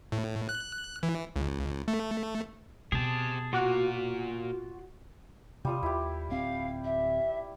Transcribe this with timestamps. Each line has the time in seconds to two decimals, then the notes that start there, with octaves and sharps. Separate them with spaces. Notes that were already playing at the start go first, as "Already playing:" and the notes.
0.12 A2
0.49 F#6
1.03 E3
1.36 C#2
1.88 A3
2.92 B2 C4 G4 G#4 A5
3.53 A#2 F4 F#4 A#4 D6 F#6
5.65 C3 G3 F4 D#6
5.83 D#2 E4 G4
6.30 D1 C4 F5
6.84 E5